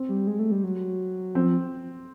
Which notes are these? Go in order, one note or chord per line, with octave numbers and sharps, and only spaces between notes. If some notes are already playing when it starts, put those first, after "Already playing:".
Already playing: C4
G3
G#3
A3
G3
F#3
F3 C4